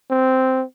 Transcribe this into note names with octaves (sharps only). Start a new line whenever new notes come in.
C4